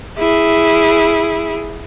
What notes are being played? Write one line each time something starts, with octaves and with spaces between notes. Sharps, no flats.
E4 G#4